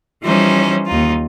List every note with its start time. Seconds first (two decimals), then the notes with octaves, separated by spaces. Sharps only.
0.23 E3 F3 G3 C#4 D#4 C5
0.87 D#2 D#4 F4